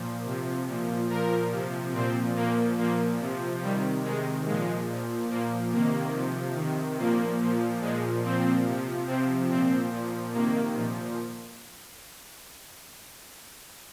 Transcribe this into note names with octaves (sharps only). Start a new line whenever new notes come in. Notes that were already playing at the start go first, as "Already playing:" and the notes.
Already playing: A#2 F3
C3 F3
A#2 F3
A#2 F3 A#4
C3 F3
A#2 F3 C4
A#2 F3 A#3
A#2 F3 A#3
C3 F3
C3 D#3 G3
C3 D#3 G#3
A#2 F3 G#3
A#2 F3
A#2 F3 A#3
C3 D#3 A#3
C3 F3
C3 D#3
A#2 F3 A#3
A#2 F3
A#2 F3 G#3
A#2 F3 C4
C3 F3
C3 F3 C4
A#2 F3 C4
A#2 F3
C3 D#3 A#3
A#2 F3